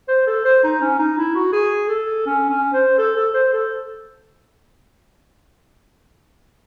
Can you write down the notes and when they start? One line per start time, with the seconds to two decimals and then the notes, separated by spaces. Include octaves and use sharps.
0.08 C5
0.27 A4
0.45 C5
0.63 D#4
0.81 C#4
0.99 D#4
1.18 E4
1.35 F#4
1.53 G#4
1.89 A4
2.26 C#4
2.50 C#4
2.73 C5
2.98 A4
3.16 A4
3.34 C5
3.53 A4